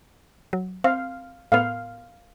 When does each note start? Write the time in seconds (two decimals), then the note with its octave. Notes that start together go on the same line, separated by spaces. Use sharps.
0.53 F#3
0.84 C4 F5
1.52 A2 B3 F5